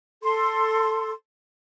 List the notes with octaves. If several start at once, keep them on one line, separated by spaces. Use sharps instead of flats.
A4 C6